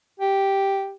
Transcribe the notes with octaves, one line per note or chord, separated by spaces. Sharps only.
G4